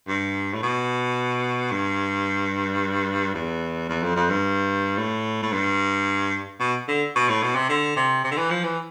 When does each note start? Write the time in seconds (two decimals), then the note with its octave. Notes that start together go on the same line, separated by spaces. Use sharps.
0.08 G2
0.54 A2
0.63 B2
1.71 G2
3.34 E2
3.89 E2
4.03 F2
4.16 F2
4.30 G2
4.98 A2
5.42 A2
5.53 G2
6.60 B2
6.88 D3
7.16 B2
7.29 A2
7.43 B2
7.55 C3
7.69 D3
7.96 C3
8.24 C3
8.31 D3
8.37 E3
8.50 F3
8.64 E3